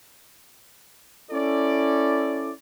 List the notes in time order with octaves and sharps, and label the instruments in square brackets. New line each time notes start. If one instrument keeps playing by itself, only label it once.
[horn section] C#4 E4 A4 D5